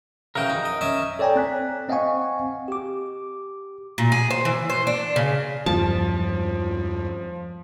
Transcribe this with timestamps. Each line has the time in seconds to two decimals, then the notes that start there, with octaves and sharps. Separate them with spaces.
0.35 C#3 E3 F#4 A#4 G5
0.50 D#4
0.65 D#5
0.81 C#4 D#5 E5
1.19 A4 C#5 D5 G5 G#5 A#5
1.36 C4 F#6 B6
1.89 C4 D#5 F5 F#5 G#5 C#6
2.68 G4 D6
3.98 A#2
4.12 G#4
4.30 C5
4.45 E3
4.70 C5
4.87 D4
5.16 C#3
5.66 E2 G2 F3 G3 A5